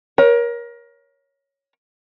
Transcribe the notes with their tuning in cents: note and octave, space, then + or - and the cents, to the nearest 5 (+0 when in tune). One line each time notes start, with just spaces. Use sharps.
A#4 +25 C#5 +0